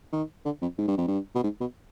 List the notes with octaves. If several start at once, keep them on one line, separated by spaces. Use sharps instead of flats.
D#3
D3
F2
G#2
G2
F2
G2
B2
G#2
B2